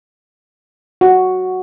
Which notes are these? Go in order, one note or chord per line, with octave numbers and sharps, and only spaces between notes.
F#4